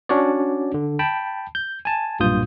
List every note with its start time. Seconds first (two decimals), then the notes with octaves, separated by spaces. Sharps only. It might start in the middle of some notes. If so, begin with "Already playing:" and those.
0.09 C#4 D4 F#4 C#5 D5
0.74 D3
0.99 G5 A5 B5
1.55 G6
1.85 G#5 A5
2.20 B1 G2 A#2 F4 D#6 G6